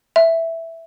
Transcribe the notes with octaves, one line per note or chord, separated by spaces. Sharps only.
E5